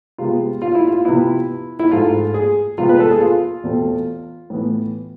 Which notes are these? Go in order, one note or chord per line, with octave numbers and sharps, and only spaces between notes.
C3 G#3 B3 F4
F4
E4
F4
C3 F3 B3 E4
E4
G#2 F3 A3 F4
G#4
C3 F3 G#3 B3 F4
B4
A4
G#4
F4
E2 B2 A3 C4
A2 E3 B3